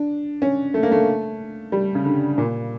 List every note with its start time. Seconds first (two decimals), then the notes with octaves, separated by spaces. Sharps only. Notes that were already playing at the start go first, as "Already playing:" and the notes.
Already playing: D4
0.42 C#4
0.74 A3
0.83 A#3
0.92 A3
1.72 G3
1.95 C#3
2.05 D3
2.38 A#2